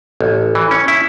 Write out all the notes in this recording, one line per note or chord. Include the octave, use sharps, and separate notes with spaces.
A1
E3
C#4
E4